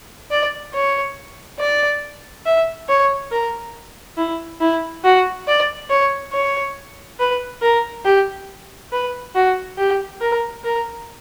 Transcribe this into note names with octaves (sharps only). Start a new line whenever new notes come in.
D5
C#5
D5
E5
C#5
A#4
E4
E4
F#4
D5
C#5
C#5
B4
A#4
G4
B4
F#4
G4
A#4
A#4